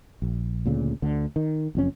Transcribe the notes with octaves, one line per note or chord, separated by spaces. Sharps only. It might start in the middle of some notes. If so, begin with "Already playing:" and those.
A#1
D2 A#2 C#3
D2 D3
D#3
F#1 F2 C#4